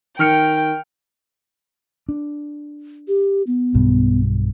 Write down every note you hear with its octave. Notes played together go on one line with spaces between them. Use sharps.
D#3 G5 F6 C#7
D4
G4
B3
B1 G2 B2